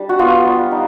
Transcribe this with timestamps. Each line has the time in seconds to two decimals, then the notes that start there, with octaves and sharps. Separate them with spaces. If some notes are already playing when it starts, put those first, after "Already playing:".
Already playing: G3 D4
0.09 F#4
0.19 B3 F4
0.45 G3
0.71 D#4